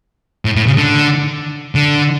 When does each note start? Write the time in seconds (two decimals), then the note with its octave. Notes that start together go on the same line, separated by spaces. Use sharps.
0.45 A2
0.56 A2
0.67 C#3
0.77 D3
1.75 D3